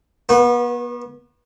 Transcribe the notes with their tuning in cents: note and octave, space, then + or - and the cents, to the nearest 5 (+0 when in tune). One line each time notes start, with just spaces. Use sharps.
B3 -35 B4 +0 C#6 -40